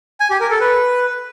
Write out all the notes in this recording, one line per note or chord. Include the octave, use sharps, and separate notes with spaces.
G#5
G4
A#4
A4
B4